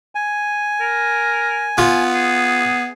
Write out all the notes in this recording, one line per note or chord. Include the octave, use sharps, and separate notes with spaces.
G#5
A#4
B3 F4
G#4